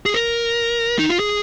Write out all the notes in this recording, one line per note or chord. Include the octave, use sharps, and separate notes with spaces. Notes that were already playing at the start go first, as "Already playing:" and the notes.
G#4
A#4
D#4
F4
G#4